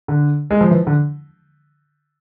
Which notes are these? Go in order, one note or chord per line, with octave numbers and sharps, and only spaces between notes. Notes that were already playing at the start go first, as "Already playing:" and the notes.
D3
G#3
F3
E3
D3